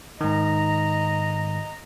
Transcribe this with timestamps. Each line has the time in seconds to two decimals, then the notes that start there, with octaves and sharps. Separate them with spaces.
0.21 G#2 D#3 D#5 A#5